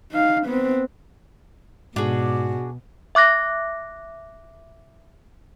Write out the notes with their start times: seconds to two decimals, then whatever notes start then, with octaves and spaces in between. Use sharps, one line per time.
0.12 D#4 F5
0.46 B3 C4
1.96 G#2 B2 D4 F#4 G#4
3.15 E5 D6 F#6 A#6